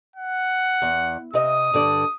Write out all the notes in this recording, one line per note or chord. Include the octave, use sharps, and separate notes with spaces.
F#5
E2
C3 D#5 E5 D#6
G2 D3 D5